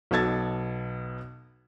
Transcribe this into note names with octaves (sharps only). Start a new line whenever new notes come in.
B1 B2 A4 G#6 A6